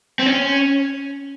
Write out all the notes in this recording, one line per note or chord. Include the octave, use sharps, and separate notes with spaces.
C4
C#4